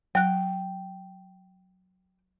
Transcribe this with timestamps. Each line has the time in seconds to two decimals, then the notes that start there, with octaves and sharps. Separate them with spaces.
0.15 F#3 G5 F#6